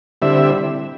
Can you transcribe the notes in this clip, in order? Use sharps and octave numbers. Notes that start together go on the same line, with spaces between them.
D3 G3 C4 E4 E5